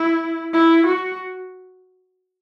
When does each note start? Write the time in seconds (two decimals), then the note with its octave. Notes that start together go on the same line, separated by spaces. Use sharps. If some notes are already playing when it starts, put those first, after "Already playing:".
Already playing: E4
0.53 E4
0.87 F#4